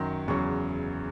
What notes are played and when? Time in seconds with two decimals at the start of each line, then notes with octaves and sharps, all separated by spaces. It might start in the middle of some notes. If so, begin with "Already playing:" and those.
Already playing: F#2 D#3 F#3 C6
0.28 E2 C#3 F#3 C#6